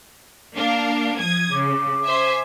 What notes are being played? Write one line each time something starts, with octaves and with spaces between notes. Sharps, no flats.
A#3 D4 F5
F3 D#6 G#6
C#3 D6
C5 E5 G#5